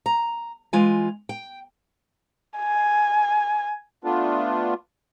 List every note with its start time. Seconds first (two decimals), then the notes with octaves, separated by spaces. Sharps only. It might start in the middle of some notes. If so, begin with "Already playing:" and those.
0.06 A#5
0.73 E3 G#3 F4 G#5
1.29 G5
2.59 G#5
4.04 A3 B3 D4 F4